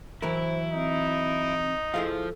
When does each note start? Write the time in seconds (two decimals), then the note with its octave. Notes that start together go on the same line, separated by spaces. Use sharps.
0.22 E3 F#3 E4 A#4 C5
0.72 C4 D#4
1.94 F3 E4 G#4 A4 F5